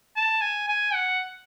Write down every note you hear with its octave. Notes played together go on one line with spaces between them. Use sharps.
A5
G#5
G#5
F#5